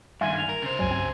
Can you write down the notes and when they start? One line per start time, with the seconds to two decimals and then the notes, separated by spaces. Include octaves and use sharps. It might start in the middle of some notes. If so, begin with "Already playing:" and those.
0.21 G2 D#3 E5 F5 G#5 C6
0.37 F7
0.49 A#4
0.62 C#3 C5
0.79 C#2 G2 F#3 G#5
0.91 C4